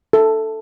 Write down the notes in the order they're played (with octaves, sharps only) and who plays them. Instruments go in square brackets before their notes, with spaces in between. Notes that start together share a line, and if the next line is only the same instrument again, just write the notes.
[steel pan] A4